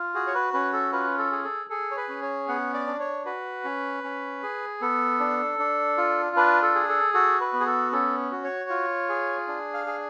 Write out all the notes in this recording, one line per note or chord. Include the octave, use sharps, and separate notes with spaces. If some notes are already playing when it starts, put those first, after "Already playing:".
Already playing: F4
F#4 G#4
C#5
B4
C#4 B4
A4
F4 B4
A4
G#4
A4
G#4 A4
C#5
B4
C#4
C#5
B3 F#5
D5
D4
C#5
F#4 B4
C#4
C#4
G#4
B3 A4
D4
D4
F4
D4 B4
A4
G#4
A4
F#4 A4
B4
B3
G#4
A4
C#4 A4
F#4
C#5
F4
G#4
D4
F5
G#4